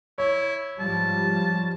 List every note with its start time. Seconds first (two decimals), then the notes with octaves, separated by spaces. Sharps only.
0.18 E4 C#5
0.79 G#2 F3 G3 A5